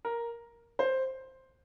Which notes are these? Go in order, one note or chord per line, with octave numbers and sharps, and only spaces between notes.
A#4
C5